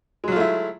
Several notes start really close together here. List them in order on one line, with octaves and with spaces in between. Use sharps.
G#3 F#3 F4 A3 E4